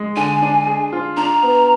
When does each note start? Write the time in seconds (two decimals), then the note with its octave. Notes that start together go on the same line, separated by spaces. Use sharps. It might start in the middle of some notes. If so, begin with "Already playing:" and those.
Already playing: G#3
0.16 D3 G#5
0.42 D4
0.67 G#4
0.93 F4
1.17 D4 A#5
1.42 B3